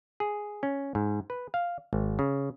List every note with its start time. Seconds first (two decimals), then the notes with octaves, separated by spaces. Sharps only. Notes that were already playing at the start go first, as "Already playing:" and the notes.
0.20 G#4
0.63 C#4
0.95 G#2
1.30 B4
1.54 F5
1.93 G#1
2.19 C#3